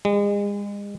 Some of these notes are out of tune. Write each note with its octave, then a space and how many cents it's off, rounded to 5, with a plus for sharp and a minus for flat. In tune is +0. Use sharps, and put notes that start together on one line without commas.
G#3 -35